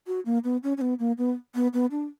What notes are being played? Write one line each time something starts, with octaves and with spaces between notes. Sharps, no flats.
F#4
A#3
B3
C#4
C#4
B3
A#3
B3
B3
B3
D4